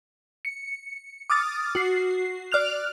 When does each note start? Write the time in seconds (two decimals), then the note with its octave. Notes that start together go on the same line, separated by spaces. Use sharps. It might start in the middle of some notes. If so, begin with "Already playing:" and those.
0.45 C#7
1.30 D6 D#6 F6 A6
1.75 F#4 C7
2.52 D5 F6 F#6 F7